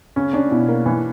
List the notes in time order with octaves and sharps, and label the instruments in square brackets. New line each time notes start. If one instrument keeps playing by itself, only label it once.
[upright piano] C#3 [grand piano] C#4
[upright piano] C#4 [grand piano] D4
[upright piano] B2 [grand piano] E4
[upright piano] A#3
E3